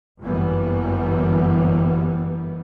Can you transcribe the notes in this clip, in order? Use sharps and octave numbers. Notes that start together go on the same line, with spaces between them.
G1 F#2 E3 G3 A#3 B3